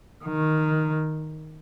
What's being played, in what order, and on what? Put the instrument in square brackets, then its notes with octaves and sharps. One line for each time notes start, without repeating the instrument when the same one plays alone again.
[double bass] D#3